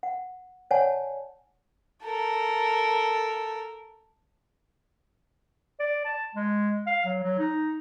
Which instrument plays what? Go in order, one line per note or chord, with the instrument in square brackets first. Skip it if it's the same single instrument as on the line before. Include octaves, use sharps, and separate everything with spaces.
[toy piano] F#5
C#5 D5 F#5 G#5 A5
[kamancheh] A4 A#4
[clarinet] D5
A5
G#3
F5
F#3
F#3
D#4